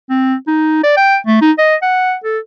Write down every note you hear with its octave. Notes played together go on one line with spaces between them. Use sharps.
C4
D#4
D5
G5
A3
D#4
D#5
F#5
A4